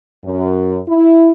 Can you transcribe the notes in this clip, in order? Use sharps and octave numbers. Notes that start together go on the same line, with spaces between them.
F#2
E4